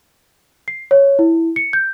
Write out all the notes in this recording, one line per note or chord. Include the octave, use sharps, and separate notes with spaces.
C7
C#5
E4
C#7
G6